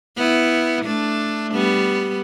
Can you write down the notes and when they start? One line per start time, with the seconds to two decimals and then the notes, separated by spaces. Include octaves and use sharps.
0.17 B3 E4
0.85 A3 D4
1.53 G3 B3